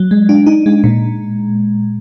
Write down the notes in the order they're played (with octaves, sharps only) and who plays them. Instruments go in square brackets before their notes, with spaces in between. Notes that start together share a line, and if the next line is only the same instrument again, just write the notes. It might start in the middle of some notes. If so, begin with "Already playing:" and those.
Already playing: [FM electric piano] F#3
G#3
D4
D#4
G#3
A#2